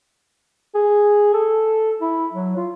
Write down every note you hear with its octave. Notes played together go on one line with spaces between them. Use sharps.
G#4
A4
E4
F#3
F4